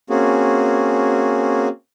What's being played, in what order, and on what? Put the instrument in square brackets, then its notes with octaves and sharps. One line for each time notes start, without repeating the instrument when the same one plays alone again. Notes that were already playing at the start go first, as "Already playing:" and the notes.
[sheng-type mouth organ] A#3 C4 C#4 F#4 G#4